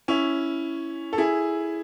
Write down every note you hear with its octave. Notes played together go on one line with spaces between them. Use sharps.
C#4 E4
A4
E4 G#4